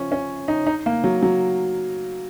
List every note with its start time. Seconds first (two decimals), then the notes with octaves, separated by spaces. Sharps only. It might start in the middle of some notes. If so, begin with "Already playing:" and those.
Already playing: F3 C#4
0.12 C#4
0.48 D#4
0.67 D#4
0.86 A#3
1.04 F#3
1.22 F#3